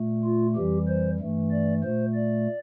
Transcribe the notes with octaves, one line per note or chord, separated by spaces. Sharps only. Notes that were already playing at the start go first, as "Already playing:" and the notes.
Already playing: A#2 A3
F4
F2 E3 G3 G4
C5
G2 E3 A3
D5
A#2 A3 C5
D5